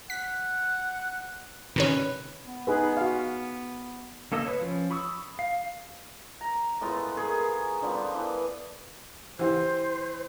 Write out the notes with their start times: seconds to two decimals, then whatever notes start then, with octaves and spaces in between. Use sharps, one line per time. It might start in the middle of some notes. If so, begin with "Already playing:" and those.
0.10 F#5 B6
1.76 C3 D#3 C#4 B4
2.45 B3
2.67 D#4 G#4 B4
2.97 F#4 F5
4.32 D3 A#3 A4 D#5 E6
4.45 B4 C#5
4.61 F3 C#4
4.91 B5 C#6 D#6 E6
5.39 F5
6.41 A#5
6.81 A2 G#3 B3 F4
7.17 B3 G#4 A#4 C#5
7.82 D3 F3 G3 B3
8.14 E3 B3 B4
9.39 E3 G4 C5